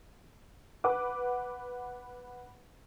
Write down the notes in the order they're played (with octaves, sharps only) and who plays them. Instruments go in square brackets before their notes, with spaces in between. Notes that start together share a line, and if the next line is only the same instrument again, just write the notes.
[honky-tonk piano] B4 F#5 D6